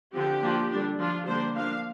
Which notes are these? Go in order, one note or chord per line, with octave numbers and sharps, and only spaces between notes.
D3 F3 C4 G4
F3 A#3 D4
D3 G3 D4
F3 D4 F4
D3 G3 A#3 D4 C5
F3 A#3 D4 F5